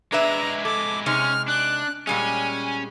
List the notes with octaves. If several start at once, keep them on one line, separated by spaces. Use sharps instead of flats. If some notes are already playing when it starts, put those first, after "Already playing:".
G#3 D4 E4 B4 E5 A#5
A4 D6
C3 G#3 C#4 D#4 F6
D4 F#6
A#2 G3 G#3 C#4 G#5